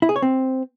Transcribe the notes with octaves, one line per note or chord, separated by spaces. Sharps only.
E4
G#4
C#5
C4